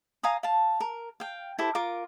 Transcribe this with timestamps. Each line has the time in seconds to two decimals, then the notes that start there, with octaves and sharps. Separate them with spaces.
0.23 F5 G#5 A#5 D#6
0.43 F5 A5
0.80 A#4
1.20 F5 G5
1.59 E4 G4 A4 C5
1.75 F4 A#4 D6